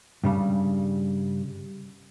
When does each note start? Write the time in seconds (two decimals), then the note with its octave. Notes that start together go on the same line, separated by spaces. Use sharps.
0.24 G2 C#3 G3